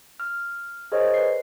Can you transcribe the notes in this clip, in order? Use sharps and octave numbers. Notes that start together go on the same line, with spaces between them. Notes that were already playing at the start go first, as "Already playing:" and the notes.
F6
G#4 A#4 C5 C#5 D#5
B4 C7